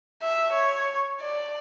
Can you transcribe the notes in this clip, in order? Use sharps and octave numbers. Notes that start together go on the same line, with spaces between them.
E5
C#5
D5